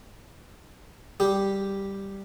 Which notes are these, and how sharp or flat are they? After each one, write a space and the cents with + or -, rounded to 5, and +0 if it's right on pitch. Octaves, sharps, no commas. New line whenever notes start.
G3 +0 G4 +0